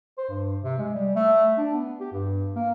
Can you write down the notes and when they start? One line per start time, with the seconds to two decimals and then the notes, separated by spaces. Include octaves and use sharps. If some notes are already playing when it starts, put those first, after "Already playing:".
0.18 C5
0.29 G2
0.63 C3
0.78 G#3
0.94 G3
1.15 A3
1.58 D4
1.73 B3
2.00 G4
2.12 G2
2.55 A#3